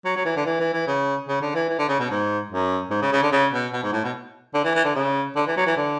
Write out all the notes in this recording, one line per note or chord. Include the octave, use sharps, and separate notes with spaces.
F#3
F#3
E3
D3
E3
E3
E3
C#3
C#3
D3
E3
E3
D3
C#3
B2
G#2
F#2
G#2
C#3
C#3
D3
C#3
B2
B2
G#2
A2
B2
D3
E3
E3
D3
C#3
D3
E3
F#3
E3
D3